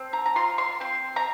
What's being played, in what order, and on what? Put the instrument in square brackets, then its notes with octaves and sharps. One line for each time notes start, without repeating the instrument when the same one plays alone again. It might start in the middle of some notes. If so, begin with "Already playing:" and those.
Already playing: [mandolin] C4
A#5
A#5
F4 C6
C6
C4 C6
A#5